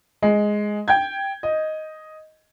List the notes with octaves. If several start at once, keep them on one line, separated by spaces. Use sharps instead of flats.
G#3
G5 G6 G#6
D#5